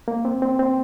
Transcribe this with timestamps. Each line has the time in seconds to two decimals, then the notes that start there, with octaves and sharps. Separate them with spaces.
0.08 A#3
0.25 C4
0.42 C4
0.59 C4